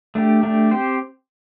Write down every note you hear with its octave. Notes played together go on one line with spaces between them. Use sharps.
A3 D4 G4
A3 D4 G4
C4 G4 C5